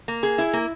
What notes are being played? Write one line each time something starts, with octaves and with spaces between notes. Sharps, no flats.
A#3
G#4
E4
A#3